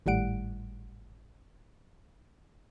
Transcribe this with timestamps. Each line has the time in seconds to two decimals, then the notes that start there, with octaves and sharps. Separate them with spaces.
0.06 G#1 A2 G3 F#5 D7